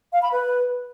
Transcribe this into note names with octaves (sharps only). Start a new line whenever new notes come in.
F5
B5
B4